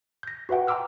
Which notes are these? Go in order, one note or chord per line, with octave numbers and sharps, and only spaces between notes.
G6 A#6
F#4 B4 E5 F#5 G5
G5 A#5 C6 D6 E6 F6